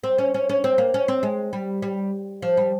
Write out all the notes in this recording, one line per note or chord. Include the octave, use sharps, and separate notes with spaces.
C4
C#4
C#4
C#4
C4
A#3
C#4
C4
G#3
G3
G3
F3
G3